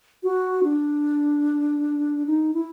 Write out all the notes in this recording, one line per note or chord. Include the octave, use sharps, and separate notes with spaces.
F#4
D4
D#4
E4